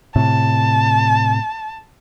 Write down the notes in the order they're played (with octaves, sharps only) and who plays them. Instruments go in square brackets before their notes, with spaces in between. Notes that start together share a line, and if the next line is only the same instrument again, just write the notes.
[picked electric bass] A2 C3 [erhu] A5